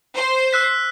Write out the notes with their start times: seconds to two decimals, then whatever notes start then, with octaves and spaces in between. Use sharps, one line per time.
0.16 C5
0.53 E6 F#6 B6